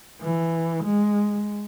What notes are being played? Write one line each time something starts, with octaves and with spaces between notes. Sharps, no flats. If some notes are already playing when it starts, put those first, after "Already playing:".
E3
G#3